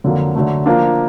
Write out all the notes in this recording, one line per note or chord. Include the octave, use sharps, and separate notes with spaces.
F2 D3 F#3 A#3
D3 F#3 A3
F3 A#3 D4